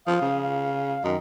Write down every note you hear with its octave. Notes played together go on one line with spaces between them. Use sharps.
F3 F5 D#6
C#3
F5
F#2 D#3 D#5